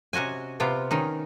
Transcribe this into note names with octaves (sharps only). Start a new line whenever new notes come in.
C3 C#4 F#4 D#5 G#5
C3 B3 F4 G5
D#3 C#4 D#4